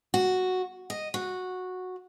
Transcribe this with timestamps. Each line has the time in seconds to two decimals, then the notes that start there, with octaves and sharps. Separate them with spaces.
0.14 F#4
0.90 D#5
1.14 F#4